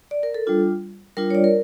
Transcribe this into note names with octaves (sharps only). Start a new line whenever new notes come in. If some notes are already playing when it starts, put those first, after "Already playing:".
D5
A#4
A4
G3 D4 F4
G3 D4 F4 A#4
C#5
D5
A#4